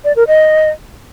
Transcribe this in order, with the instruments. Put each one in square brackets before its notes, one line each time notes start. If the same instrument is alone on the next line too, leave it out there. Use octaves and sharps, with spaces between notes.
[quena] D5
A#4
D#5